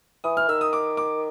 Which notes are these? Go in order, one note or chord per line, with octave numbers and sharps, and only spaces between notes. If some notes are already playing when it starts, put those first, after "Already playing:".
E3 D#6
F6
D#3 E6
D#6
D6
D6